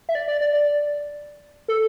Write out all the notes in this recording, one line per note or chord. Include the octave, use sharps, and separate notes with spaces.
E5
D5
D5
D5
D5
A4